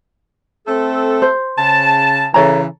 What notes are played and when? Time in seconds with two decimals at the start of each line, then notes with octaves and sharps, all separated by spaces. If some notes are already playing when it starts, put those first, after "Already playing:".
0.66 A3 C4 A4
1.22 C5
1.57 C#3 A5
2.34 C#3 E3 A4 C#5 A#5